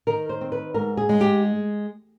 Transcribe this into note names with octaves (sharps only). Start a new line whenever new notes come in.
D#3 A#4
C5
C4
B4
G#2 A#4
G#4
G#3
G4